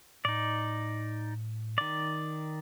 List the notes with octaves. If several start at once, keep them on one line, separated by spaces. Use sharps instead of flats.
A2 D#4 D5
D#3 D5